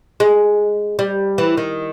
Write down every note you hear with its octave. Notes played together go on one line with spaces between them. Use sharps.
G#3
G3
E3
D#3